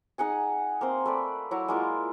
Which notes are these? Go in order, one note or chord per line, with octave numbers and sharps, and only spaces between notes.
D#4 G#4 F#5 G#5
A#3 C4 C5
A3 B4 D5
F#3 E4 F#4
G#3 A#3 E4 F4